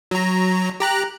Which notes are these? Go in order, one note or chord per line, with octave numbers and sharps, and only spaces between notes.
F#3 A#5
G4 A#5 F#6